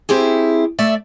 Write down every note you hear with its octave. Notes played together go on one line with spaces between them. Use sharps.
C4 E4 G4 G#4
A3 D5 E5